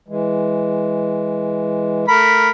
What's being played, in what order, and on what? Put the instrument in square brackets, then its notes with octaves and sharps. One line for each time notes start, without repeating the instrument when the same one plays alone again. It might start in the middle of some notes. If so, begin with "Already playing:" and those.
[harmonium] E3 G#3
[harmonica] A3 A#4 B5